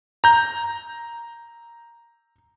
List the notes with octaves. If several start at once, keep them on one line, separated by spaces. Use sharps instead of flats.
A#5 G6